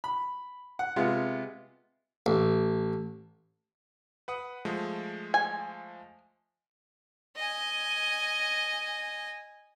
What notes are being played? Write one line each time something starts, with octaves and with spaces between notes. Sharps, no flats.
B5
F#5
C3 G#3 B3 F4
A1
B4 F#5 D#6
F3 G#3 A3
G#5
D#5 G#5